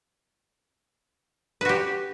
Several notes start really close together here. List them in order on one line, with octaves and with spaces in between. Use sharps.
B4 F#4 G4